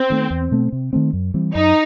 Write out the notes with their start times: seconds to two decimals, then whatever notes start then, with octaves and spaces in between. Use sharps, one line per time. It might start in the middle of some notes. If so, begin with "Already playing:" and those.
Already playing: C4
0.10 D#3 A3
0.31 E2
0.51 B2 A3 C4
0.72 C3
0.93 D#3 A3 C4
1.13 F#2
1.34 E3 G3 C4
1.55 F#2 D#4